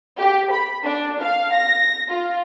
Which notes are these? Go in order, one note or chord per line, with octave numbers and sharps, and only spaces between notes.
G4
B5
D4
F5
A#6
F4